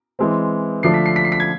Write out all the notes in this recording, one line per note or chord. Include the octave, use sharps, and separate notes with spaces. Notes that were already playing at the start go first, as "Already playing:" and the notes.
E3 G#3 C4
D3 F3 A3 D4 C7
B6
C7
B6
C7
B6
G#6